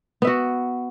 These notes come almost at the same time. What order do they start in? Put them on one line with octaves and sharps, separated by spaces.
B3 E5 F#4